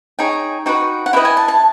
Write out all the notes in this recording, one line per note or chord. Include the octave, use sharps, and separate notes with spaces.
D#4 G#4 C#5 G5
D#4 F#4 B4 G5
F#5
E4 G4 B4 D#5 G5
G#5
A5
A5